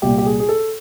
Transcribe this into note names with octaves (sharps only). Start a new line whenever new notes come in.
C2 A#2 G4
G4
G#4
G#4
A4